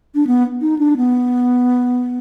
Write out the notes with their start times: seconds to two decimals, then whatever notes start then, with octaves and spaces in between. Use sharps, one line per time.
0.15 D4
0.27 B3
0.61 D#4
0.79 D4
0.97 B3